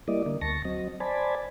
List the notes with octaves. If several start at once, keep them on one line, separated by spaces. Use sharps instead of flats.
G3 A#3 E4 D5 D#5
D3 A#3
D2 A5 C#6 A#6
F#3 C4 D#5
C5 D5 G#5 A5 B5